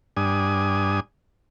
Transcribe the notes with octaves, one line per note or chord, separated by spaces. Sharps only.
G2 D4 G#5 D#6